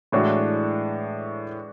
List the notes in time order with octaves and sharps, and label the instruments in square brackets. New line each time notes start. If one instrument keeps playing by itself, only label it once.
[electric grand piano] A2 [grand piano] E3 G#3 D4 F#4 C#5